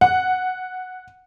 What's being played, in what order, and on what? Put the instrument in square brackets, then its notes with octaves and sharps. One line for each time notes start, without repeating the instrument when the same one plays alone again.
[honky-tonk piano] F#5